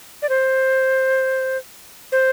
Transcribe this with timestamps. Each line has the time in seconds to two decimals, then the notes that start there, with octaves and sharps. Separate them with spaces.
0.22 D5
0.29 C5
2.12 C5